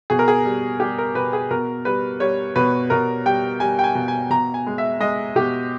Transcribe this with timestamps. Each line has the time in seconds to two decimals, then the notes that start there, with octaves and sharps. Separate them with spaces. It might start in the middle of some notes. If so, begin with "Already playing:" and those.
0.10 B2 G#4
0.19 A#4
0.28 G#4
0.45 G3
0.80 G3 G4
0.98 A#4
1.15 B2 B4
1.33 G#4
1.51 B2 A#4
1.85 G3 B4
2.20 G3 C#5
2.56 B2 B4
2.90 B2 A#4
3.26 G3 G5
3.60 G3 G#5
3.79 G5
3.84 G#5
3.95 B2
4.08 G#5
4.30 B2 A#5
4.54 G#5
4.66 G#3
4.78 E5
5.00 G#3 D#5
5.36 B2 G4